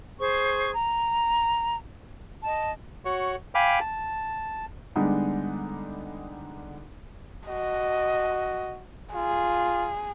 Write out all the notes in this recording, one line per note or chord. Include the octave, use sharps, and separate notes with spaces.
G#4 C5 C#6
A#5
D#5 A5
F#4 C#5
F5 G5 G#5 B5 D6 F6
A5
D3 G3 G#3 B3 D4 D#4
F#4 D#5
F4 G#4